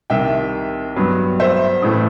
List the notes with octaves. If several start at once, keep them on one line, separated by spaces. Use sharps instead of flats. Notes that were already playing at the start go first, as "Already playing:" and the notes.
C2 C3 D#3 E5 G5
G2 F#3 B3
C5 E5
A1 A2 E3 A3